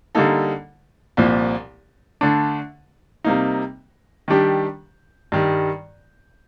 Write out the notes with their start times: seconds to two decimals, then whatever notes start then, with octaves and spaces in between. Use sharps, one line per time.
0.15 D3 G3 A#3 D#4 A4
1.17 C2 A#2 F3
2.21 D3 A3 D4
3.24 C3 G3 A#3 D#4
4.28 D#3 G3 D4 G4
5.32 G2 D#3 G3